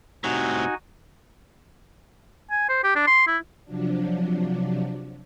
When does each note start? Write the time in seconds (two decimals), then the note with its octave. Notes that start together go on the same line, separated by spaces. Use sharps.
0.24 A2 C3 D#4 F#4 G#5
2.51 G#5
2.69 C5
2.84 G4
2.96 D4
3.07 C6
3.27 E4
3.65 C3 F3 F#3 D4